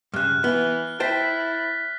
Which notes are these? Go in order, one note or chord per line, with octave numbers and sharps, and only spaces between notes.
G2 C#3 F6 F#6
E3 B3 G7
E4 C5 G5 A5 A6 B6